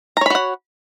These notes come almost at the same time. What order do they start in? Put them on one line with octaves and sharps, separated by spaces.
A#5 C#5 B5 F#4 F#5